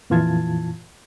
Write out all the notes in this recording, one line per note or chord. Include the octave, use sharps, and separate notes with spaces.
F2 A#2 E3 F4 A5 G#6